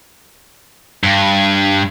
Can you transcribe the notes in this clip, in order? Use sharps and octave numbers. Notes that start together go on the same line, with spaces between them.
G2